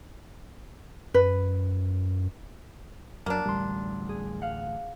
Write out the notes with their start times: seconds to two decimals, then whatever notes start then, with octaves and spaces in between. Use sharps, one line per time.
1.14 F#2 B4
3.26 F#2 F#3 A#3 D4
3.46 A1 D2 G3 C6
4.09 G#4
4.42 F5 F#5